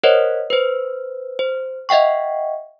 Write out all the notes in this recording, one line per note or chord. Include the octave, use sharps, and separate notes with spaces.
A#4 C5 C#5 D#5 F#5
B4 C5
C5
D#5 E5 F#5 G5 C#6